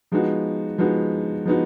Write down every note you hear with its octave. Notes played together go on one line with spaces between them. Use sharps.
F3 G#3 B3 D#4 F#4
F3 G#3 B3 D#4 F#4
F3 G#3 B3 D#4 F#4